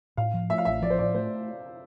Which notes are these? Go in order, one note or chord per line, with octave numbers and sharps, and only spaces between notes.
A2 F5
F3
A3 E5
F5
A1 E5
F3 D5
C5
A2 D5
A3 C5